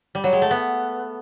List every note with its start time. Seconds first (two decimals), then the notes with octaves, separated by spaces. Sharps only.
0.15 G3
0.24 F#3
0.33 G#3
0.42 A3
0.51 B3